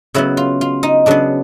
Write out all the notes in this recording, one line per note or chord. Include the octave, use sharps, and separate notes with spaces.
C#3 F#3 B3 E4
F4
F4
D#4
C#3 F#3 B3 D4